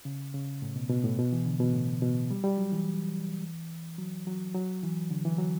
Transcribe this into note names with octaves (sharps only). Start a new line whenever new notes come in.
C#3
C#3
A2
B2
B2
A2
B2
E3
D3
B2
A2
B2
G3
G3
F#3
E3
F#3
F#3
F#3
E3
D3
E3
F#3